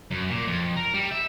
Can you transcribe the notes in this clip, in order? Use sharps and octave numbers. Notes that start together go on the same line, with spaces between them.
F#2
A#2
F2
A#4
G3
E5